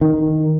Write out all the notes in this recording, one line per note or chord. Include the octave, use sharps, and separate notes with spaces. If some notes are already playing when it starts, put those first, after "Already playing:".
D#3